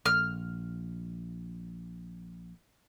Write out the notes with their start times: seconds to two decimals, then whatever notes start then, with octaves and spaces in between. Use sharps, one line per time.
0.06 A#1 F6